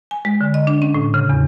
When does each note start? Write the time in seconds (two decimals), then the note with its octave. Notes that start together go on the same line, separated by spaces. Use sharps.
0.11 G#5
0.25 G#3
0.41 D3
0.54 D#5
0.67 D4
0.82 C#4
0.94 A2
1.14 C#3
1.29 E2